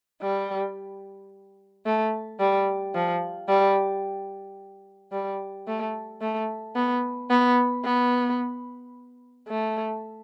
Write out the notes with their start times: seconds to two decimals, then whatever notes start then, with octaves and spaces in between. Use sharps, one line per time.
0.22 G3
1.85 A3
2.40 G3
2.94 F3
3.49 G3
5.12 G3
5.67 A3
6.21 A3
6.75 B3
7.30 B3
7.84 B3
9.48 A3